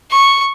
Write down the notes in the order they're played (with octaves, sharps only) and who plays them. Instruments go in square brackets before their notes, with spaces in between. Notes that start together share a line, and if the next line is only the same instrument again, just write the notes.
[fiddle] C#6